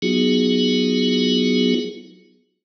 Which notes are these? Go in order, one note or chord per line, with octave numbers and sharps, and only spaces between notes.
F#3 B3 D#4 F4 F#4 G#4